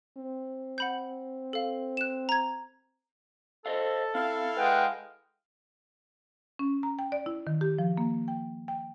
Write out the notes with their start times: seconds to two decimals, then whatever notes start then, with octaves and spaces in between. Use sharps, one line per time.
0.18 C4
0.78 F#5 B5 G6
1.53 A4 F5
1.97 F#6 E7
2.29 A#5 G#6
3.66 A4 C5 D#5 F5
4.15 C4 E4 F5
4.57 G#3 B4 F#5 G5
6.59 C#4
6.83 A#5
6.99 G5
7.12 D5
7.26 E4
7.47 D#3
7.61 G4
7.78 F3
7.97 A#3
8.28 G5
8.68 G5